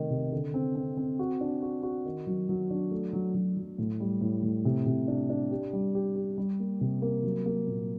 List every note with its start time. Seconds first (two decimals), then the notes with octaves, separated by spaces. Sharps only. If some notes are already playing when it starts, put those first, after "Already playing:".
Already playing: C3 D#3 A3
0.10 C3
0.32 D3
0.54 C4
0.76 C4
0.97 C4
1.19 F#4
1.41 D4
1.62 F#4
1.83 F#4
2.05 D#3
2.27 F#3
2.49 F#3
2.70 D4
2.91 A3
3.13 F#3
3.35 F#3
3.57 F#3
3.78 A2
4.00 G3
4.21 A2
4.43 A2
4.65 C3
4.86 C3
5.08 D4
5.30 D4
5.51 G4
5.73 G3
5.95 G4
6.16 G4
6.38 G3
6.60 A#3
6.81 C3
7.02 A#3
7.23 F#3
7.46 A#3
7.67 A#2